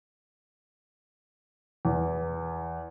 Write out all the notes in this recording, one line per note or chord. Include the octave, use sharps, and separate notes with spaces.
E2